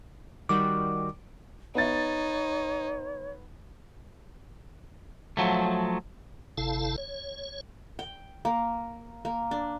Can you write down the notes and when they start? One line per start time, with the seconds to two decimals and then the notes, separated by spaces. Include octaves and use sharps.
0.49 D#3 G3 F#4 D6
1.75 B3 D#4 C#5 A6
5.37 F3 F#3 A3
6.58 G1 C3 E4 A4 F5 A5
6.98 C#5
7.99 G5
8.45 A#3
9.25 A#3
9.51 D4